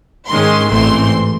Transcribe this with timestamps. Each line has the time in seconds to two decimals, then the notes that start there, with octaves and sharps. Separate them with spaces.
0.28 G#2 D#3 G#3 C#4 C6
0.70 A1 G#2 E3 A3 C4 C6